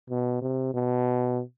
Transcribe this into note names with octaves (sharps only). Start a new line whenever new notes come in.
B2
C3
B2